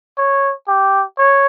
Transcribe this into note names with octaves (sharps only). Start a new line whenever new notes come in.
C#5
G4
C#5